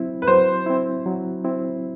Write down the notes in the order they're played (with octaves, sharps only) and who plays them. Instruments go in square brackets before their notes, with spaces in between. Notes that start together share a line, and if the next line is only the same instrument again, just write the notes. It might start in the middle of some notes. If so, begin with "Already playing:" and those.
Already playing: [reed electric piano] F#3 C4 E4
[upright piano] B4
[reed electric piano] F#3 [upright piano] C5
[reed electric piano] C4 E4
F#3
C4 E4